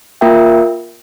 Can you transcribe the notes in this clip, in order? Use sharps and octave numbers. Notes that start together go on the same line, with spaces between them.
A#3 F4 A#4 E5 G5